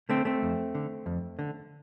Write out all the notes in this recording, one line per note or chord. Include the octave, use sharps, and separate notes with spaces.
D3 A3 C4
A3 C4
F2
D3
F2
D3